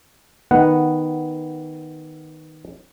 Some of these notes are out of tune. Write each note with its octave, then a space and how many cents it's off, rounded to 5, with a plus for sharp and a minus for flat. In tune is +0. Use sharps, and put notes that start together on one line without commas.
D#3 +0 B3 +0 F#5 +0